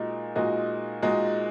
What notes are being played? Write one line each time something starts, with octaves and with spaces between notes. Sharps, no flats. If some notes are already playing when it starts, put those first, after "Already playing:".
Already playing: A#2 G#3 D#4 F#4
A#2 G#3 D#4 F#4
A#2 G#3 D#4 F#4